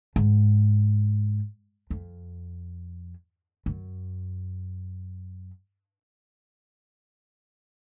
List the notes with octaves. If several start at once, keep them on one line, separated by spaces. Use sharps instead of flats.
G#2
F2
F#2